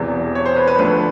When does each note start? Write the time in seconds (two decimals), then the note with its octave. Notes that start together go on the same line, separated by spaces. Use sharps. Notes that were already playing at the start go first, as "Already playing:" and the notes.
Already playing: E1 E2 C3
0.35 C#5
0.46 C5
0.56 B4
0.68 B4
0.79 D2 D3 F3 B4